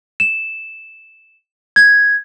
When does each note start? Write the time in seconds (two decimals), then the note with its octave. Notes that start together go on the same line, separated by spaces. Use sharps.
0.20 E7
1.76 G#6